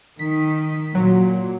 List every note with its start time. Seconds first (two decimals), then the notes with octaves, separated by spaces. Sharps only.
0.19 D#3 B6
0.95 A#2 F#3